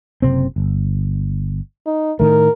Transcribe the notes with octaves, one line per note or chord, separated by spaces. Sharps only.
F#1 C3 C4
G1
D#4
A2 D#3 A3 A#4